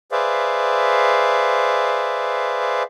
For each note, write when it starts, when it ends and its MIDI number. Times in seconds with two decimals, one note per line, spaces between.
0.12 2.83 68
0.12 2.83 71
0.12 2.83 72
0.12 2.83 74
0.12 2.83 76
0.12 2.83 77